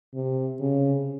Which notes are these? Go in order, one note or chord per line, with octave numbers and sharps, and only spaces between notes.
C3
C#3